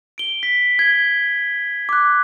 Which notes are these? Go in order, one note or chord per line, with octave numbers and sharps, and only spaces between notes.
D7 G7
B6
G#6 G7
D6 F#6